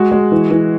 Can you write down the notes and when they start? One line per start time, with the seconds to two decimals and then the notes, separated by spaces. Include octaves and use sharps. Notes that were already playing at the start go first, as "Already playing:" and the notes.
Already playing: G#3 F#4
0.12 G#3
0.32 E3
0.51 E3